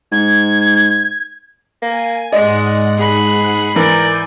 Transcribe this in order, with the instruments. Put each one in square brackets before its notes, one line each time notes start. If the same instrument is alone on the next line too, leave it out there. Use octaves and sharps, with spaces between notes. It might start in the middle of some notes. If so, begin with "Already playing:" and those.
[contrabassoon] G#2 [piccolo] G#6
[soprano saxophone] A#3 [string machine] G#5
[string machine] G#2 F#5 [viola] G#3 [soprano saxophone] D5 [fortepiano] D#5
[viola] G#4 B5
[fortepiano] E3 [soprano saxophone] A#4 [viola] D5 [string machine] G#5 G6